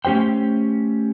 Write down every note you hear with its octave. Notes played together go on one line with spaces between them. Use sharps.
A3 C#4 G4 C5 G5